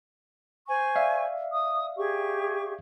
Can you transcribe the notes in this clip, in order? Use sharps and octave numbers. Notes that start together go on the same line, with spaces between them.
C5 G#5 C#6
D5 E5 F5
D#6
G4 G#4 C#6